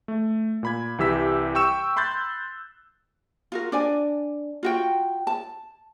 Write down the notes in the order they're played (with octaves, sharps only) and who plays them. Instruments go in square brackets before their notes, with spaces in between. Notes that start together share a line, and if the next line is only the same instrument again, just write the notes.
[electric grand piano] A3
A#2 B5 G#6
C2 E3 G4 E6 B6
G5 C#6 E6 E7
B5 C6 F#6 G6 A6
[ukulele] F4 F#4 A#4
D4 D5 G#5
F4 F#4 G5
A5